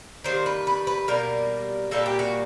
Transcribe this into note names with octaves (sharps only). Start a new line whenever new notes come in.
D#3 G3 A#3 C5
B4
B4
B4
B2 G3 A#3 A#4
A#2 G3 A#3 A4
G4
F#4